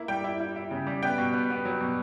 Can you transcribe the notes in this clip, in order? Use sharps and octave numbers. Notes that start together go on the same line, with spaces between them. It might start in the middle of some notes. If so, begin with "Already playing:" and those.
Already playing: A#3 E4
G3 G5
E4
E4
E4
C#3
G3
B3 G5
B2
B3
B3
F#3
B2